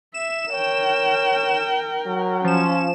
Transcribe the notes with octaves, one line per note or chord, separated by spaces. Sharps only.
E5 E7
A#4 C#5 G5
F#3
F3 C#4 E7